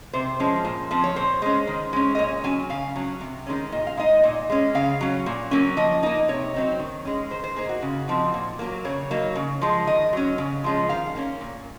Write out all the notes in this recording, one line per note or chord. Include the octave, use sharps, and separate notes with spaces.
C3 C5
F3 G#3 C#4
A#2
F3 C4
C#5
A#2 C5
G#3 C#4
D#3
G#3 C#4
D#5
A#2 C#5
F#3 C#4 G#5
C#3 F5
F#3 C#4
C3
D#3 G#3 C#4
A#2 D#5
F5
G#3 D#4 D#5
A#2
G#3 C#4
C#3 F5
F#3 C#4
A#2
F#3 A#3 C#4
F3 D#5
A#3 D#4 D#5
C3 C#5
F#3 C4 D#4
D#3
G#3 C#4
D#3 C5
C5
A#3 D#4 G#4
F#4
C#3
F3 C4 D#4
A#2
F#3 A#3
C#3 C#5
F#3 A#3 D#4
C#3
F3 G#3
D#3 D#5
F#3 C#4
C#3
F3 G#3 C#4
D#3 F5
A#3 C#4
A#2